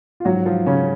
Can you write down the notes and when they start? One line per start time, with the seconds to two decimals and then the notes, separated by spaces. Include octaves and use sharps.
0.20 F4
0.25 G#2 F3 F#3 F#4
0.46 F3 F4
0.67 C#3 C#4